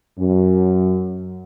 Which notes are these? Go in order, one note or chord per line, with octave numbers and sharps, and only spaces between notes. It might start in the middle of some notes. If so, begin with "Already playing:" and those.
F#2